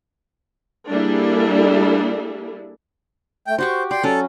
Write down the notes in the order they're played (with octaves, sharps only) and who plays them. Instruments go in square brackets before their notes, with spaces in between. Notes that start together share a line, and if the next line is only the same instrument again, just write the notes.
[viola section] G3 A#3 D4 E4 G#4 A4
[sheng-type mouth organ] A3 G5
[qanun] F#4 G4 C#6 [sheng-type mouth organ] C5
[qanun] D5 [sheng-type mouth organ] G5 C6
[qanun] F#3 C#4 [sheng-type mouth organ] A4